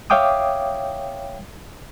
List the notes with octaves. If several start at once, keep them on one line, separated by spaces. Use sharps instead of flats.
C#5 E5 F5 G5 D6 D#6